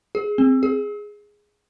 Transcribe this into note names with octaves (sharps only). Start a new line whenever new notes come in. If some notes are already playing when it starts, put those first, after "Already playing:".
G#4
C4
G#4